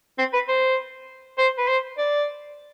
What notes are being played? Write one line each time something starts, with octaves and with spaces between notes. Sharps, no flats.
C4
B4
C5
C5
B4
C5
D5